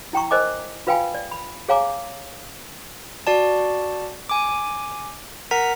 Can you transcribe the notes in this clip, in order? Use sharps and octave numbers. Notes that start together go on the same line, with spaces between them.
E4 G5 A#5 C#6
A#4 C5 D#5 G#5 D6
F4 B4 F5 G5 G#5 B5
D5
B5
G#4 C#5 F5 G#5 A#5 D6
F#4 D5 A5
G#5 D6
A#4 F#5 A#5 B6